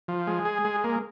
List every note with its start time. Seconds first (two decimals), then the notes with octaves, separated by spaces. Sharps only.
0.08 F3
0.27 G#3
0.45 G#4
0.65 G#3
0.84 A#3